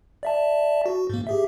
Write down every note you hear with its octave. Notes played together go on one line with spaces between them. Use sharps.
D5 E5 A5
F#4
G#2 A#3
G4 G#4 E5